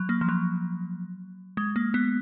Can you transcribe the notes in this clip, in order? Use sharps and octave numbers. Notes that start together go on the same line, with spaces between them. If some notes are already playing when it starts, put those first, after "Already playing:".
Already playing: F#3
A#3
F3
F#3
G#3
A#3
B3